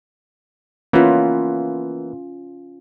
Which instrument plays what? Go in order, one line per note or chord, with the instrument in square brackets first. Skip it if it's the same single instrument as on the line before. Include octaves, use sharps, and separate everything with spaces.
[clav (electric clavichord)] E3 A#3 B3 [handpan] C#4 F4